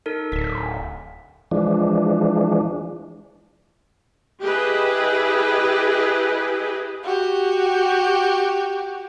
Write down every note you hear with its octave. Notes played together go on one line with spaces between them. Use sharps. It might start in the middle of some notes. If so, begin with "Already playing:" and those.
D#4 A4 A#4
D1 B6
E3 F3 G#3 D4
E4 G4 G#4 B4 D#5
F#4 G4